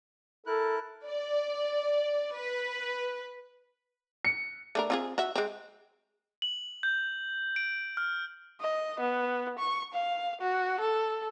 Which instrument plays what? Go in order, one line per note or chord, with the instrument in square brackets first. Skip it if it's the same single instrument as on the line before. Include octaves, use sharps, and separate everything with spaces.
[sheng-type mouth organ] E4 A#4 F#6 [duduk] A4
[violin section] D5
B4
[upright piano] C#7
[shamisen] A3 D4 A#4
C4 F4 G#4
F#4 E5
G#3 C4
[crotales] F#7
G6
D7
F6
[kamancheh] D#5
B3
C#6
F5
F#4
A4